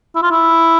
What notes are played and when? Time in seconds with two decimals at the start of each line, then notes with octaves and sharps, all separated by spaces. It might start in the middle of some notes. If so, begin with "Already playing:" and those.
0.16 E4
0.23 F4
0.31 E4